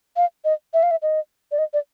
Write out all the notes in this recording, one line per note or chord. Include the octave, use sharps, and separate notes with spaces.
F5
D#5
E5
F5
E5
D#5
D5
D#5
D5